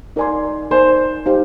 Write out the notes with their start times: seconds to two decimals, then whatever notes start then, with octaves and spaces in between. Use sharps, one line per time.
0.16 D#4 A#4 D5 G#5 C6
0.71 D#4 A#4 C5 D5 G#5 C6
1.26 D#4 G4 C5 F5